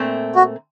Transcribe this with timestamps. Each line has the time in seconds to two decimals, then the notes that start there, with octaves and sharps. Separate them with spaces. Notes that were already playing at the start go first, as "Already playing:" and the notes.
Already playing: A#2 A3 C4
0.36 F#4